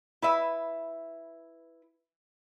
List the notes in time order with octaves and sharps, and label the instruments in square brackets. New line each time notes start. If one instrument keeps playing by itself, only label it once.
[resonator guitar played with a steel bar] E4 B4 E5